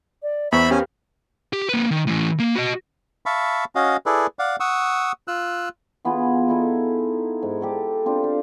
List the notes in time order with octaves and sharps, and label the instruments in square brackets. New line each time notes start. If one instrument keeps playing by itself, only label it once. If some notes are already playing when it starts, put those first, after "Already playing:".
[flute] D5
[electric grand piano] E2 C#6 [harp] B3 [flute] C5 [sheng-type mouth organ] E5 B5
[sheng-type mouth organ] C#4 [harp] G4 A#4 F5
[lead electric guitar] G4
A#3 B4
D#3
A2 E3
A#3
F#4 D#5
[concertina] E5 F5 A5 B5 C#6
C#4 F#4 D#5 F5
E4 G#4 A4 B4 D5
D5 F5 F#5
F#5 C#6 D#6 E6
F4 E6 F#6
[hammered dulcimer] E3 B3 F4 G#4
D#4 E4 A4 G#5
G#2
G4 A4 D5
C4 D4 F4
F5